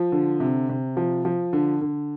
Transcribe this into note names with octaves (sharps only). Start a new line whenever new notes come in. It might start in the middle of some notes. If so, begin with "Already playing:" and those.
Already playing: F3
D3
C3
C3
F3
F3
D3
D3